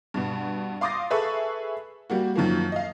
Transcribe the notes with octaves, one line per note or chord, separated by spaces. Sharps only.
G2 B2
F5 C6 D6 D#6 A6 A#6
G#4 A4 B4 E5 C#6
G3 A#3 F#4
F#2 D#3 F3 A#3
D#5 F5